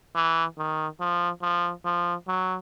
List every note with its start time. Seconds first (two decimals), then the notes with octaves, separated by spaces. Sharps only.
0.15 E3
0.58 D#3
1.00 F3
1.42 F3
1.85 F3
2.28 F#3